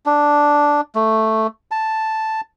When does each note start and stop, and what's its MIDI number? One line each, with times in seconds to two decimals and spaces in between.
0.06 0.81 62
0.95 1.47 57
1.71 2.41 81